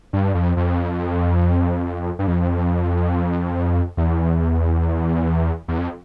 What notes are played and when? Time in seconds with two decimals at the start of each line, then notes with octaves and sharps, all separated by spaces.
0.13 G2
0.34 F2
0.57 F2
2.19 G2
2.28 F2
3.97 E2
5.68 E2
5.78 F2